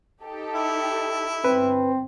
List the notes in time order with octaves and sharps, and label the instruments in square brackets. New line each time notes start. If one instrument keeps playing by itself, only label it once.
[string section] D#4 G4 A4
[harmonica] E4
[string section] G1 [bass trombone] C4 [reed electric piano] B4